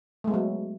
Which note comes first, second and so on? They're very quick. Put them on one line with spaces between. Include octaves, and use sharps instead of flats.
A3 G#3 B3 F#3